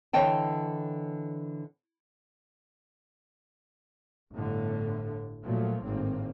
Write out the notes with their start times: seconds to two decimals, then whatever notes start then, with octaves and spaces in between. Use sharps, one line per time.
0.13 D3 E3 C#5 D#5 G5 A5
4.33 G1 A2 D3
5.43 A#2 F3 F#3 A3
5.84 G#1 A2 A#3 C4